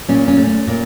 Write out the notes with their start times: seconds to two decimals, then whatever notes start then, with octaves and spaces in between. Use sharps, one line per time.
0.08 A#2 C#4
0.28 C#4
0.38 A3
0.47 C#4
0.67 A#2